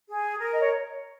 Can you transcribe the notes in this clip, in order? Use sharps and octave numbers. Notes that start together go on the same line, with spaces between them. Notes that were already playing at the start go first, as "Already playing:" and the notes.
G#4
A#4
D#5
C#5